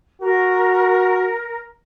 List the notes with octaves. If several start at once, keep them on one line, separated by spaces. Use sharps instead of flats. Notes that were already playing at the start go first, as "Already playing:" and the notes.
F#4 A#4